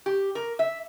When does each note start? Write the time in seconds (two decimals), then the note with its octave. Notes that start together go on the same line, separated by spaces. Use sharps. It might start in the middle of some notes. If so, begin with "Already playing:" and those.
0.06 G4
0.35 A#4
0.59 E5